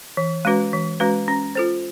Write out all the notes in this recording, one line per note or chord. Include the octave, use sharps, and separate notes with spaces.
E3
G#3 C#4 F#4 B4
E3
G#3 C#4 F#4 B4
C#4
F4 A4 C5